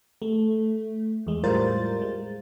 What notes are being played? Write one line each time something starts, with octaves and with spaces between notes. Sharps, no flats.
A3
E2 G#3
A2 G3 F4 A#4 C5 A6
G#3